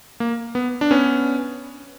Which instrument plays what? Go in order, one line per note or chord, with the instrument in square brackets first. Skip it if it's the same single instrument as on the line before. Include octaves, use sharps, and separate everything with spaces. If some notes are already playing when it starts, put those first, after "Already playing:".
[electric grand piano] A#3
B3
D4
B3 C#4